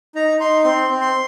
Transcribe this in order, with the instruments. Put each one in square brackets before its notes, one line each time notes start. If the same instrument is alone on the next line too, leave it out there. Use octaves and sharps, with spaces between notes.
[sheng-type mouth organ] D#4 A#5
D#4 C6
C4 C6
C4
C6